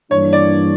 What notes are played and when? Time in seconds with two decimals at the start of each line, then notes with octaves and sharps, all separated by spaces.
0.11 G2 E3 A#3 D4 C#5
0.33 D5